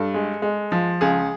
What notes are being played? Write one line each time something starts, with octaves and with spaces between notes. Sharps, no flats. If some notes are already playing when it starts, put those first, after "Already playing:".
Already playing: G2 A4
G#3
G#3
F3
C#2 G#4